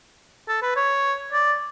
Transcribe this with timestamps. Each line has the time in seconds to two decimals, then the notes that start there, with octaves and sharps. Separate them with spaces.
0.48 A4
0.62 B4
0.76 C#5
1.32 D5